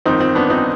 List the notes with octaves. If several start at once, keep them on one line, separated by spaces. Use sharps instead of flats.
G1 F2 D#3 C4 D#4
C4
B3 D4
C4 D#4